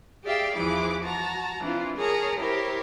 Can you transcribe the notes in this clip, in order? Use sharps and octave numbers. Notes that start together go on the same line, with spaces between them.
G4 G#4 D5 E5 F5 G5
E2 E3 F3 E4 G#4 D6
F#4 A5 A#5
E3 C4 D4 F4
G#4 A#4 C#5 A5 A#5
E4 G4 A#4 C5 C#5